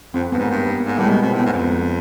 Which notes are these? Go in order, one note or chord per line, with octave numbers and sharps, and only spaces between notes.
F2 C4
G2 B3
G#2
A#3
G2
B3
G#2 A#3
A2 G3
G#3
B2
B2 C4
A2
B3
G#2
F#2
F2